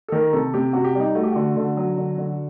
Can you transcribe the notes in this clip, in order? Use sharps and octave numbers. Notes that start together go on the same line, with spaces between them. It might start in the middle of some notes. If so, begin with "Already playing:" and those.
A4
D#3 A#4
C3 A4
C3 G4
C3 F#4
G4
G3 D#4
A3 F#4
G4
D3 F#4
D3
F#3
D3
D3